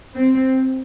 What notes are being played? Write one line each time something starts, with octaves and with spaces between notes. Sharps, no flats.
C4